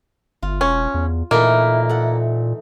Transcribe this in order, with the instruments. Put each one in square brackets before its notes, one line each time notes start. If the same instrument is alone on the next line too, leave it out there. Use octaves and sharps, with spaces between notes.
[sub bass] G1 [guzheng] F4
[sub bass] E1 [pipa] C#4
[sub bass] E2
[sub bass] A#2 [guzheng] E3 A3 D#4 [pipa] A#3
[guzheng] A4 F#5